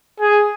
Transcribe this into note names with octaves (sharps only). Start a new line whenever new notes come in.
G#4